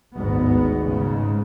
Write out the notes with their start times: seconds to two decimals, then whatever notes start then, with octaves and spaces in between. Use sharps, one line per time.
0.15 G#1 D2 G#2 B3
0.89 G#2 C#3